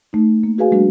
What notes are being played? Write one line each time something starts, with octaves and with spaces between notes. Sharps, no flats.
A3 D#4
A#3
F#4 G#4 B4 F5 G#5
F#3 G#3 A#3 D4 F#4